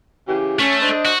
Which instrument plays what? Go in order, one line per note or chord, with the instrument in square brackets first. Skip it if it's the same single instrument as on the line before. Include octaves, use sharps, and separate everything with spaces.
[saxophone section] C#3 E3 G4
[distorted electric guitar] A3 [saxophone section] C#4
[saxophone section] D4 C5 D#5
[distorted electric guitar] F#4